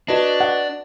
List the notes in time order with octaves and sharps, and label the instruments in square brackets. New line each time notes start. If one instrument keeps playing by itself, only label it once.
[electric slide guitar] D4 [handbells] F#4 B4 D#5
[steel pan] F#5